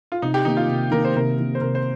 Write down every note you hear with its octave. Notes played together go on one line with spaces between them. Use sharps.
F4
C3 D#4
G4
D#3 A#3 D#4
F4
C3
D#3 A#3 A#4
C5
C3 A#4
D#3 A#3
C5
C3 A#4
C5